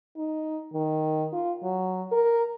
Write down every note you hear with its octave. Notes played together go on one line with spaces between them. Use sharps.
D#4
D#3
F4
F#3
A#4